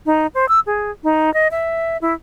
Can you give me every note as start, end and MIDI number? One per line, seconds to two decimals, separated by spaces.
0.06 0.27 63
0.35 0.48 72
0.49 0.60 88
0.66 0.91 68
1.04 1.33 63
1.34 1.48 75
1.51 1.97 76
2.02 2.14 64